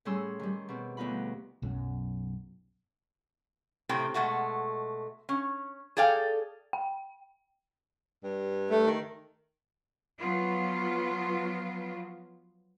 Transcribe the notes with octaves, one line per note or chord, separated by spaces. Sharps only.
A2 G3 C#4 G#4 C6 E6
D#3 G3
B2 C4
D2 B3 D#4 F4 B5
B1 F#2
A2 C3 C4 G5
B2 G#3 A3 F#4
C#4
G#4 A4 D5 F5 G5
G5
G2
A3
D#3
F3 F#3 B3 F4